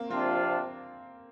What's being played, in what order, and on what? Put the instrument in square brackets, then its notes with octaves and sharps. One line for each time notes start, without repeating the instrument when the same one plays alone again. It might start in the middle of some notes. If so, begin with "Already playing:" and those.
Already playing: [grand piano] A#3 C4
[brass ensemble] C3 F3 D4 F4 [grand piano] C4